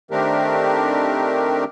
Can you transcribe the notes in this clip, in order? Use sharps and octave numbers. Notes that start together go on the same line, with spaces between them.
D#3 A3 C4 D4 G4 A#4